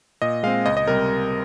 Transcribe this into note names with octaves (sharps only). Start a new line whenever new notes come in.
A#2 D#5
G#3 C4 F5
C#2 D#5
D#5
C3 G3 C4 A#4